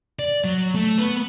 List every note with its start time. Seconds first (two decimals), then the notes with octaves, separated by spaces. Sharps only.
0.19 D5
0.44 F#3
0.75 A3
0.98 B3